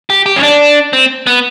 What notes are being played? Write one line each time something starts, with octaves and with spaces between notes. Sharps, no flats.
G4
G4
C#4
D4
C4
B3